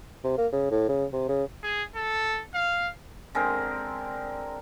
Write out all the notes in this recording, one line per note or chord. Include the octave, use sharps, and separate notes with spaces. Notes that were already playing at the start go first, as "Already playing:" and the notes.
C3
A#3
C#3
A2
C#3
C3
C#3
G#4
A4
F5
D3 G#3 C4 A#4